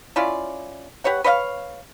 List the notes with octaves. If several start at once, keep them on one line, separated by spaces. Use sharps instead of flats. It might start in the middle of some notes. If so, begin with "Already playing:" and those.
C#4 E4 F4 D5
G4 B4 C#5 F#5
B4 C#5 D#5 F5